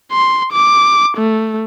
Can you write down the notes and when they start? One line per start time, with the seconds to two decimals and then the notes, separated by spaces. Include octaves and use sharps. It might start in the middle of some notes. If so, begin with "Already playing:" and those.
0.12 C6
0.53 D6
1.17 A3